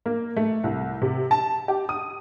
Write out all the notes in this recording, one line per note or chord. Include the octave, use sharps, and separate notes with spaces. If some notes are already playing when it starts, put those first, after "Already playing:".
A#3
A3
C2
C3
A5
G4
D#6